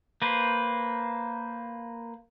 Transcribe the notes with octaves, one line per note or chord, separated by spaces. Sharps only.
A#3 B4 C5